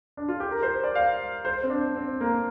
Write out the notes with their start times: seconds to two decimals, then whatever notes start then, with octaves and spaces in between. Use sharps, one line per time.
0.17 D4
0.28 F4
0.40 G4
0.51 A#4
0.63 C5
0.84 D5
0.95 F5
1.45 C5
1.63 C4
1.70 D4
1.96 C4
2.21 A#3